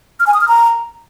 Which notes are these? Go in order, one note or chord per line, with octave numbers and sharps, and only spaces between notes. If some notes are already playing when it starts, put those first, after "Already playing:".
F6
G#5
D#6
F6
A#5